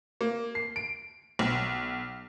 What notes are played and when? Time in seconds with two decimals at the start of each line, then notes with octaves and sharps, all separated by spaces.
0.21 A#3
0.55 C7
0.76 D7
1.39 B1